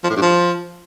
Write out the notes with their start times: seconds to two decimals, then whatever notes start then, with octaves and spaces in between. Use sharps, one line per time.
0.04 F3
0.10 A2
0.16 G2
0.22 F3